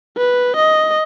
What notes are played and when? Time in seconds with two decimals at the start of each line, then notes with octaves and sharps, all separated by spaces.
0.17 B4
0.56 D#5